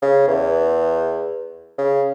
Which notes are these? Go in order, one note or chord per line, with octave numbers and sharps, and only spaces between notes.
C#3
E2
C#3